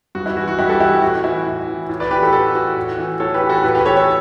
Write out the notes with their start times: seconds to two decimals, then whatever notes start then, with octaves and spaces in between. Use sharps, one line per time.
0.15 G2 F#4
0.26 E4
0.37 E3 F#4
0.47 F#4
0.59 G2 E4 G4
0.69 F#4 A4
0.80 E3 E4 G4
0.91 F#4
1.02 A2 F#4
1.24 E3 E4
1.46 A2
1.68 E3
1.89 A2
2.00 B4 D5
2.11 E3 G4 B4
2.22 F#4 A4
2.33 A2 F#4 A4
2.55 E3 F#4 A4
2.76 A2
2.98 E3
3.20 A2 A4 C#5
3.34 G4 B4
3.42 E3
3.49 F#4 A4
3.64 A2 G4 B4
3.75 G4 B4
3.85 E3 A4 C#5
3.97 A4 C#5